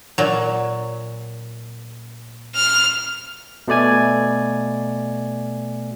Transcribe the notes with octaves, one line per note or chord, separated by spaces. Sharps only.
A#2 F#3
F6
B2 A3 D5 G#5 G#6